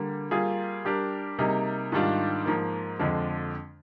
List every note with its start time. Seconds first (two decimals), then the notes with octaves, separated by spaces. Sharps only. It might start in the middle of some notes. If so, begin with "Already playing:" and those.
Already playing: D3 G3 A#3
0.31 G3 A#3 F4 G#4
0.85 G3 D4 G4 A#4
1.38 C3 G3 A#3 D#4 G#4
1.92 G#2 D#3 G3 D4 F4
2.46 G#2 F3 A#3
2.99 F2 D3 F3 G#3 D4